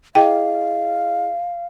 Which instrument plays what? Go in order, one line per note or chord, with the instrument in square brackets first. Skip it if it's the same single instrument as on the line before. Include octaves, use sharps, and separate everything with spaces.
[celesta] E4 G#4 D#5 [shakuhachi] F5 [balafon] G5